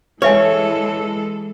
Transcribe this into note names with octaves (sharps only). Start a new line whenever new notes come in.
E3 G#3 A4 B4 C#5 E5 G#5